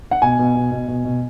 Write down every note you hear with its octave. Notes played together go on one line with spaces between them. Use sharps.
F#5
B2 G#5
B2
B2
B2
B2
B2